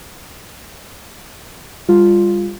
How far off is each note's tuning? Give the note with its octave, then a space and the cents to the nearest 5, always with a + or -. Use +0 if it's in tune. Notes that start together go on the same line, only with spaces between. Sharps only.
G3 +35 F4 +0